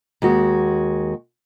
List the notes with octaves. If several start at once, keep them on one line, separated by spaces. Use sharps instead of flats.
D#2 G#3 F#4